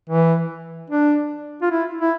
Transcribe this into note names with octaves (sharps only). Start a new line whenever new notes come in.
E3
D4
F4
E4
E4